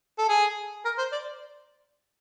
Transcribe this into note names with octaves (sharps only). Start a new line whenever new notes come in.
A4
G#4
A#4
C5
D5